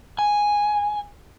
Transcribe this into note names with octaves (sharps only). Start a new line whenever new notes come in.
G#5